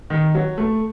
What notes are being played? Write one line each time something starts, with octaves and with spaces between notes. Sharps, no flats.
D#3
F#3
A3